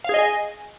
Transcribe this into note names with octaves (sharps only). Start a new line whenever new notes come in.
G#4 D#5 F5 G#5